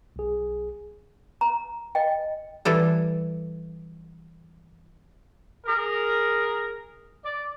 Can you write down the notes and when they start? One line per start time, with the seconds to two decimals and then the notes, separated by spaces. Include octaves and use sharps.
0.16 B1 G#4
1.41 A#5
1.95 D#5 G5
2.65 E3 G3 A4
5.66 G#4 A#4
7.24 D5